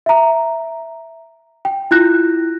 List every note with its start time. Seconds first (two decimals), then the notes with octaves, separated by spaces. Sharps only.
0.06 E5 A#5
1.65 G5
1.91 E4 F4 F#6 G6 A#6